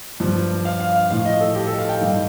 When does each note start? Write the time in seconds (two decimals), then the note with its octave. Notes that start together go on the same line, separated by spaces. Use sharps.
0.20 G2 F3
0.65 F5
0.80 F5
0.95 F5
1.10 A2 F3 F5
1.25 D#5
1.41 A4
1.55 G4
1.67 A4
1.78 F5
1.89 G5
2.01 G2 D#3 G3